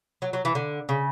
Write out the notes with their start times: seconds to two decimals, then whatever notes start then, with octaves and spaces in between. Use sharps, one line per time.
0.22 F#3
0.33 F#3
0.45 E3
0.55 D3
0.89 C#3